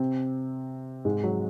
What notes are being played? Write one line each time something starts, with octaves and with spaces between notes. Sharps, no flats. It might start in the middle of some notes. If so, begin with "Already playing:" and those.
Already playing: C3 C4
G#2 G#3
F#3